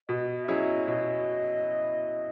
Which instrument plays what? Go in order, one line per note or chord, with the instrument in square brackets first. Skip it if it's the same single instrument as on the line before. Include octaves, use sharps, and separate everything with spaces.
[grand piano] B2 [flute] D#5
[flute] E5
[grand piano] F#3 C#4 E4 G#4 [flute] D#5
[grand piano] B2 [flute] D#5